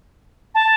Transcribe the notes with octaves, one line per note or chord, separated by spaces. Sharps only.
A5